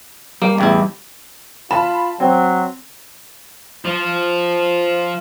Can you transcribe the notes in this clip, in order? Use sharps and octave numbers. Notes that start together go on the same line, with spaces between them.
G3 A#3
A1 E2 E4
F4 A5 B5 E7
F#3 C4
F3